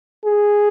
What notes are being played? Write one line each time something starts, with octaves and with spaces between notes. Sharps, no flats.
G#4